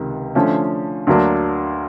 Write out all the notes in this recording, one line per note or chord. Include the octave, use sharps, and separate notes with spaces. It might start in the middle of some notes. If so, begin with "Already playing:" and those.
Already playing: C#2 C3 D#3
D3 F3 A3 C#4
D2 D3 F#3 A#3 D4